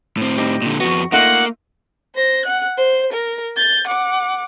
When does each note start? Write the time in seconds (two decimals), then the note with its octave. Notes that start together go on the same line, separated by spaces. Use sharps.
0.17 A2 C4
0.38 G3 D#4
0.62 A#2 D3
0.80 F2 B3 F#4
1.12 A3 A#3 D#4 F4 F#5
2.15 C5 A#6
2.45 F#5 F#6
2.77 C5
3.13 A#4
3.56 G6 A6
3.87 F#5 D6